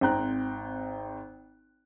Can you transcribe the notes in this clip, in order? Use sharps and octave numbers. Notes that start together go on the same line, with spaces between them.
G#1 C4 G5 A#5 F#6